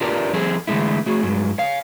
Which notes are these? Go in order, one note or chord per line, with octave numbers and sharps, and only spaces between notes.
D4 F4 G4 A#4 B4 D5
F3 G3 C4 G#4 A4
D3 E3 G#3 A3 E4
A3 F#4 G#4
G2 F#3 G#3
C#5 F5